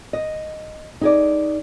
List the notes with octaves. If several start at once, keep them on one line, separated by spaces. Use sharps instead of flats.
D#5
D#4 G#4 D5